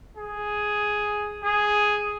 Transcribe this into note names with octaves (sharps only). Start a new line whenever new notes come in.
G#4
G#4